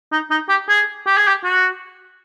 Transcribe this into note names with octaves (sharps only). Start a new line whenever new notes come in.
D#4
D#4
G4
G#4
G4
G#4
G4
F#4